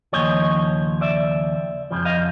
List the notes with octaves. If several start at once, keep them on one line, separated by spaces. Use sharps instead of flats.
D#2 C#3 F3 C#5 D#5
D5 E5
F2 C#3 F3
D#5 F5